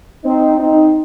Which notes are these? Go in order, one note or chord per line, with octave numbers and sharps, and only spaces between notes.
C4 D#4
C4 D#4